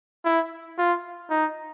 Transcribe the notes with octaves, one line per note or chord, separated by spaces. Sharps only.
E4
F4
D#4